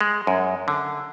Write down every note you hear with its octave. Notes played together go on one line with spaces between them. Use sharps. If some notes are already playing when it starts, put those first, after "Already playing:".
G#3
F#2
D3